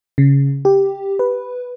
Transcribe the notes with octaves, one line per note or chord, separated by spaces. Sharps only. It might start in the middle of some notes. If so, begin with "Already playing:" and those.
C#3
G4
B4